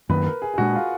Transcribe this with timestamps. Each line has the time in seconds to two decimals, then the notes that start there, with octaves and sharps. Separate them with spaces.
0.09 F#2 D#3 A#3 B4
0.26 A#4
0.42 G#4
0.54 G#4
0.58 A#2 G#3 D4 F#4
0.75 F4